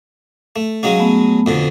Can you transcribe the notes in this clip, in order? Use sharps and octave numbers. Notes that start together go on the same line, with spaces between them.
A3
F#3 G#3 C#4 F5
A3 B3
F2 B2 D3